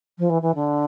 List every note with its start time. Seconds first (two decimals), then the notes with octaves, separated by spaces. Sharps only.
0.18 F3
0.29 E3
0.42 E3
0.55 D3